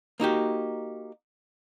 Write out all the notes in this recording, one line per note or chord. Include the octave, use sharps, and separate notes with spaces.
A#3 D#4 F#4 G4